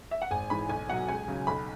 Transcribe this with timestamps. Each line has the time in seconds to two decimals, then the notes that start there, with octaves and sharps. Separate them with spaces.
0.11 E5
0.22 F#5
0.31 G#1 G#5
0.50 G#2 E3 B5
0.69 B1 G#5
0.89 B2 F#3 F#5
1.08 C#2 G#5
1.28 C#3 F#3
1.47 B1 B5